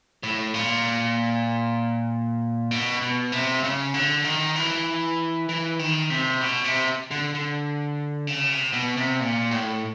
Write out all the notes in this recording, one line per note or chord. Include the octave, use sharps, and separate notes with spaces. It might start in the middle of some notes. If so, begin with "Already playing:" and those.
A2
A#2
B2
B2
C3
C#3
D3
D#3
E3
E3
D#3
C3
B2
C3
D3
D3
C#3
C3
B2
C3
A#2
A2